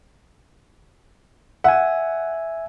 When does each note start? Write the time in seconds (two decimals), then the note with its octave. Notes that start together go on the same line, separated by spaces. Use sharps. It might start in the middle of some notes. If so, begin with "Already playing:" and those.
1.64 E5 F#5 G#5